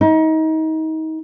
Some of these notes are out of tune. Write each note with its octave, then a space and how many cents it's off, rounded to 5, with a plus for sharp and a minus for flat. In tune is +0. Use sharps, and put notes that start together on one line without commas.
D#4 +30